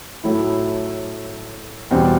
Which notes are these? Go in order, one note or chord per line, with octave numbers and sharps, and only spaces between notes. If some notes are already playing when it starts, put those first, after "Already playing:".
A2 F#3 A3 E4
E2 B2 G3 C4